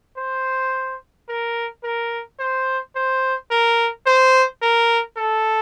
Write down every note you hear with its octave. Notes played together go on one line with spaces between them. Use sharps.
C5
A#4
A#4
C5
C5
A#4
C5
A#4
A4